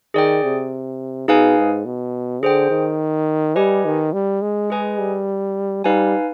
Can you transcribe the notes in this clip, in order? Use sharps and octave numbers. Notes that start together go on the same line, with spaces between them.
D#3 G#4 D5 G5
C3
B2 D#4 G#4 B4 F5 G#5
G#2
B2
D3 G#4 C5 G5
D#3
G3 G4 B4 D#5 G#5
D#3
G3
G#3
G#4 B4 D#5 G#5
G3
G3 D#4 B4 F5 G#5